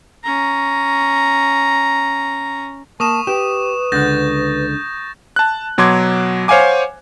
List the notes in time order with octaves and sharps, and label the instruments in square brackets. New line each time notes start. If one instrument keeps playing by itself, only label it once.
[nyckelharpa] C#4 A#5
[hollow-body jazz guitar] A#3 [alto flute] A5 [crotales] C#6 D#6 E7
[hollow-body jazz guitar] G4 [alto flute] B4 [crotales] E7
[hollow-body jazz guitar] C#2 D3 F#5 [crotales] G6 A6 A#6
[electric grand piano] A5 F#6
B2 F#3 C6 D6 G#6
C5 C#5 F5 F#5 G#5 D6